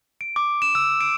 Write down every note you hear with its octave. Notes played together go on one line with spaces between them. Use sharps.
D7
D6
E7
E6
D7